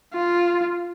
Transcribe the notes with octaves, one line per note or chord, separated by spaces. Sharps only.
F4